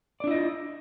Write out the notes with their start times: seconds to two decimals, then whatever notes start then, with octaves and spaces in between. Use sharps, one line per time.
0.20 D5
0.24 D4
0.27 E4
0.31 D#5
0.34 F4